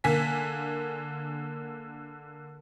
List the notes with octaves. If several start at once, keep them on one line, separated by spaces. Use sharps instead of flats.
D3 A#3 G#5 B6